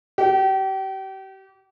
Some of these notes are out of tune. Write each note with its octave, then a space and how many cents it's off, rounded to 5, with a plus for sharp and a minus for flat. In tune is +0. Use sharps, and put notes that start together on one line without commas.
G4 -35 F#5 +45